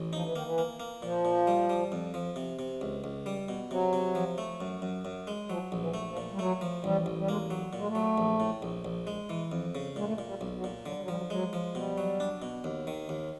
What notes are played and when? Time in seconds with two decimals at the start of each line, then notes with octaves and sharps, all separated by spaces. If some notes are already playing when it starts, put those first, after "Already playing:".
Already playing: A1
0.13 F3 D#4
0.23 E3
0.33 D#3 A#3
0.43 E3
0.58 A#3
0.80 A#3
1.02 A#2 F3
1.25 A#2
1.47 G3
1.70 G3
1.92 F2
2.14 F3
2.36 C3
2.59 C3
2.81 C#2
3.04 C#2
3.26 G3
3.49 B2
3.71 C3 F#3
3.93 C3
4.15 F3
4.38 A3
4.61 F#2
4.82 F#2
5.05 F#2
5.27 G#3
5.50 F3 F#3
5.72 A#1
5.80 E3
5.94 A3
6.09 F3
6.17 A#2
6.32 G3
6.39 F#3 A3
6.61 F3
6.84 A1 G3
7.06 A1
7.18 G3
7.28 G#3 A#3
7.50 F#3
7.73 A#2 G#3
7.87 A3
7.95 F#3
8.18 A#1
8.40 A2
8.62 A#1
8.85 A#1
9.07 G#3
9.30 E3
9.52 F2
9.75 C#3
9.96 A#2 G#3
10.05 A3
10.14 G#3
10.18 A#2
10.26 G3
10.41 B1
10.56 F#3
10.64 A#2
10.85 D3 F#3
10.94 G3
11.01 F#3
11.08 F3 G3
11.17 F#3
11.30 F#3 G#3
11.53 F3
11.75 B2 G3
11.98 F#3
12.20 D4
12.42 B2
12.64 D#2
12.87 D#3
13.09 D#2